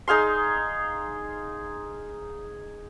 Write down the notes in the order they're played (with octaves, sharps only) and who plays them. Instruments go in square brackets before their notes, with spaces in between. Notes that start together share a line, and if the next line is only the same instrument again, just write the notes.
[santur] D#4 G#4 F5 C6